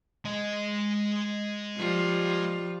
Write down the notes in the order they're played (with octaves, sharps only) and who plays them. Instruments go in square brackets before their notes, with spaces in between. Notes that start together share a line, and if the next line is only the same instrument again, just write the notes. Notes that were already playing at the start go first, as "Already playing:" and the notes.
[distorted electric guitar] G#3 D#5
[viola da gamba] F3 G3 F4